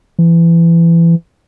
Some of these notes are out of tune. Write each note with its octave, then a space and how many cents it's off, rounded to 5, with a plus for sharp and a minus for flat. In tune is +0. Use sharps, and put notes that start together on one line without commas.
E3 +25